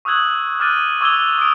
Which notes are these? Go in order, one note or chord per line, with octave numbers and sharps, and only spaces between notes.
C#6 D#6 E6 F#6 G#6 F#7
C#6 D6 F6 F#6 A6 D#7
C#6 D6 E6 G#6 F7 G7
D#6 D7